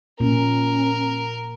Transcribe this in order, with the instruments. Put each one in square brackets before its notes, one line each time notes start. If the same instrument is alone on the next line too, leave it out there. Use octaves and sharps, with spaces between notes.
[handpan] A#2 [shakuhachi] C#4 [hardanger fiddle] A#4